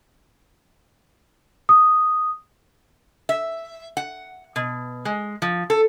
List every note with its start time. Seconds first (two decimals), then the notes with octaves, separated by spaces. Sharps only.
1.69 D#6
3.29 E5
3.97 F#5
4.56 B2
5.05 G#3
5.42 F3
5.70 A4